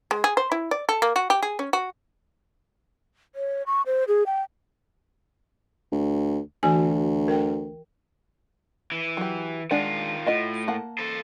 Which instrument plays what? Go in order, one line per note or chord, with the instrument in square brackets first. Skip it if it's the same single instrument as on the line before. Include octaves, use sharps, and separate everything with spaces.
[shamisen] G#3
G#4
C5
E4
D5
A4
A#3
F#4
G4
G#4
C#4
F#4
[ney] C#5
C#6
C5
G#4
G5
[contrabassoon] D2
[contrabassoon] D2 [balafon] E3 F#4 G#5
[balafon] A#4 G5
[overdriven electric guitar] E3
[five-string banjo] F#3 G4
[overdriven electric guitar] D#3 F4 [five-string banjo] G#3 D4 F#5
[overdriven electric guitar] A2 [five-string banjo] F4 D#5 F#5
[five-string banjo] A#3 F#5 A5
[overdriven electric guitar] A4 C5